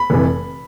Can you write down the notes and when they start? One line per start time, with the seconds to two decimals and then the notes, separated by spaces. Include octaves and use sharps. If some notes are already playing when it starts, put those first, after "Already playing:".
Already playing: B5
0.10 F1 C3 E3